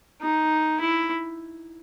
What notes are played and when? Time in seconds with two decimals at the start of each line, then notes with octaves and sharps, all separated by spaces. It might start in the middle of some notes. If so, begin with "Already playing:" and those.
0.21 D#4
0.81 E4